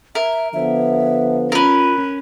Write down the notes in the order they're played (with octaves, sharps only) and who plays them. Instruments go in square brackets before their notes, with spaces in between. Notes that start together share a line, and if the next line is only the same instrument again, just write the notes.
[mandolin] A#4 [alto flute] E5
[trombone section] D3 F3 B3 [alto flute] E5
[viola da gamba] C#4 [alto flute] F4 [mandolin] A#4 B4